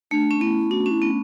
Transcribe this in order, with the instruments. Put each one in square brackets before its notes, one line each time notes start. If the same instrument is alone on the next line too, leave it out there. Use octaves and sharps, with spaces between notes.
[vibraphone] A3 [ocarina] D4
[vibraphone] C#4
[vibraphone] B3 [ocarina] E4
[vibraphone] D4 [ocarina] F#4
[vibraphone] C#4
[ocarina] E4
[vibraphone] B3